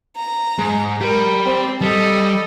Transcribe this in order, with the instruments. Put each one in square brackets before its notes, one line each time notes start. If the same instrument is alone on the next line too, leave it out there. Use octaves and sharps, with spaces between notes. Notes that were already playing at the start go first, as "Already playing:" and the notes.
[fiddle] A#5
[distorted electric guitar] G#2
[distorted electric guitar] G4 B5 [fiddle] A#4
[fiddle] C4
[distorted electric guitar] G3 [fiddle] A4 D#5